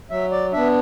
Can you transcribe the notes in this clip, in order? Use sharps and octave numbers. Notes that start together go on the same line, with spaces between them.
F#3 E5
D5
B3 D4 E5